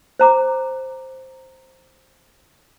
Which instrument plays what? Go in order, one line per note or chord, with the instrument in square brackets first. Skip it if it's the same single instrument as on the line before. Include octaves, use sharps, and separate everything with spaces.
[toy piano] C5 A#5 D6